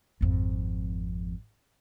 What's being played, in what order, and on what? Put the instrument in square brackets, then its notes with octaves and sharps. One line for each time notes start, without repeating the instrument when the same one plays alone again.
[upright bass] G#1 F2